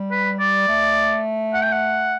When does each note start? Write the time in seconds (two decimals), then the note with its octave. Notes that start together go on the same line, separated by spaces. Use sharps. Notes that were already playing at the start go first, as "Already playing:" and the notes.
Already playing: G3
0.11 B4
0.40 D5
0.68 A3
1.54 F#5
1.63 G5
1.72 F#5